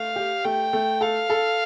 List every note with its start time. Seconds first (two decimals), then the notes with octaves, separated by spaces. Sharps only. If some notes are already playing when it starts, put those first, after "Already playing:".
Already playing: A3 F5
0.16 G4
0.44 A3 G5
0.73 A3
1.01 A4 F5
1.30 A4